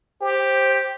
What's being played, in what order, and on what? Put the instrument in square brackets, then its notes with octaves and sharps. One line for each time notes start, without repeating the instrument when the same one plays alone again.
[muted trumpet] G4 [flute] C5